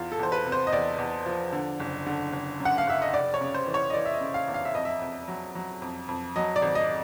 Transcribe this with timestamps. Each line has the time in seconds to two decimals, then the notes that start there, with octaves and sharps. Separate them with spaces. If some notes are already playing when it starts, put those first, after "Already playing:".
Already playing: E2 F4
0.12 A4
0.19 E2 C5
0.32 B4
0.45 C3
0.52 C5
0.67 D#5
0.72 E2 D5
0.98 E2
1.26 F3
1.53 D3
1.80 F#1
2.06 D3
2.33 F#1
2.60 F#2
2.65 F#5
2.78 F5
2.87 F#1 E5
3.02 D#5
3.14 F1 D5
3.34 C#5
3.41 C#3
3.54 C5
3.67 E3
3.74 C#5
3.90 D#5
3.93 E3 D5
4.05 E5
4.14 D#5
4.20 C#3
4.34 F5
4.48 E2
4.54 F5
4.65 E5
4.74 F2 D#5
4.85 E5
5.01 F2
5.28 F#3
5.55 F#3
5.82 F2
6.09 F2
6.36 F#3 D#5
6.56 D5
6.62 G#1
6.75 D#5